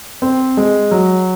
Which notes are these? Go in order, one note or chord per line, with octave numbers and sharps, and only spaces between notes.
C4
G#3
F#3